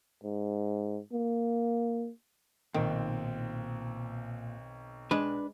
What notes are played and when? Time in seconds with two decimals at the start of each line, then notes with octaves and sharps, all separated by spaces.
0.23 G#2
1.12 A#3
2.74 B1 A#2 D#3 C4
5.11 G#3 D4 B4